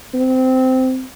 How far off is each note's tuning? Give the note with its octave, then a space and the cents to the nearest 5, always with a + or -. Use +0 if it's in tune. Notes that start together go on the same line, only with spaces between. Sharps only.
C4 -15